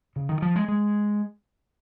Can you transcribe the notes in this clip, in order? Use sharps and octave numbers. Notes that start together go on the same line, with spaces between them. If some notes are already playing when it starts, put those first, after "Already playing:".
C#3
D#3
F3
G#3
G#3